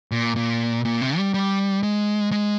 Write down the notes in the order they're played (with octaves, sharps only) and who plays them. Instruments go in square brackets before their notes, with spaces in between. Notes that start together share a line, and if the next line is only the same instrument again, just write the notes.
[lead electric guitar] A#2
A#2
A#2
C3
G3
G3
G#3
G#3